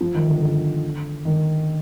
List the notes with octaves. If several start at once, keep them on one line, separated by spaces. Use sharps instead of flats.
F3
D#3
D3
D3
D#3